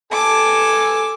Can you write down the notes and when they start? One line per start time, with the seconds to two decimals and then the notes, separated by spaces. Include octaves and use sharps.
0.13 A4 G#5 A5 D6